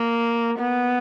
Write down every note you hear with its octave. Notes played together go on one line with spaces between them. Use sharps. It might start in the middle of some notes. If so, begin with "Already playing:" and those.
Already playing: A#3
B3